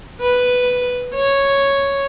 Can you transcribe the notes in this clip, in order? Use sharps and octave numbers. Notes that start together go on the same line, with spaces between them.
B4
C#5